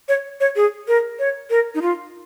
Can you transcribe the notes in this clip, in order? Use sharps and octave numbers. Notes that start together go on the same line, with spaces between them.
C#5
C#5
G#4
A#4
C#5
A#4
D#4
F4